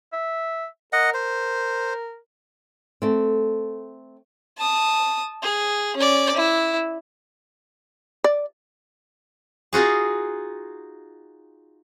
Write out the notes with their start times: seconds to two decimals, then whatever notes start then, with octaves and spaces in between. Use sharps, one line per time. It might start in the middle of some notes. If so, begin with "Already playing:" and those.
0.13 E5
0.93 A#4 D#5 F#5
1.14 C5
3.02 A3 C4
4.58 A5 D#6
5.42 G#4
5.97 C#4 D5
6.35 E4
8.24 D5
9.73 D#4 F4 F#4 G#4